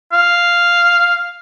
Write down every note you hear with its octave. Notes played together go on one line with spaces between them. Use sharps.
F5